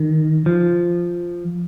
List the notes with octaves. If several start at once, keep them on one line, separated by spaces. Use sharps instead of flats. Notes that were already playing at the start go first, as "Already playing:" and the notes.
Already playing: D#3
F3